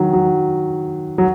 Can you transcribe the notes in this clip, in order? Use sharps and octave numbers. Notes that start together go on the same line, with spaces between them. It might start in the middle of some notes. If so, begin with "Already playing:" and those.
Already playing: D#3 F#3
F#3
F#3